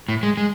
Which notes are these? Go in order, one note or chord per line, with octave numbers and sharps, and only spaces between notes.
A2
G#3
G#3